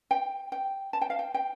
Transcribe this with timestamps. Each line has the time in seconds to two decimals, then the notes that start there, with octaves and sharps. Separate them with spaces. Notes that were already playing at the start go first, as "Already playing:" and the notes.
0.11 G5
0.52 G5
0.93 A5
1.01 G5
1.10 F5
1.19 G5
1.34 G5